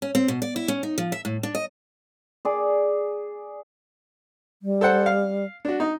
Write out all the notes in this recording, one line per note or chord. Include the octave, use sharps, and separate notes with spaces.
C#4
C4
B2
D5
E4
C#4
D#4
F3
E5
A2
D4
D#5
G#4 D5
G3
A4 C5 F#5
F5
D4 F#4
D#4